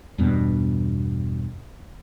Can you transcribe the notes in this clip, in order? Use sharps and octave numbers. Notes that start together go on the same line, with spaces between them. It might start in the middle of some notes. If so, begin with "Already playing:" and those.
E2 G2 B2 B3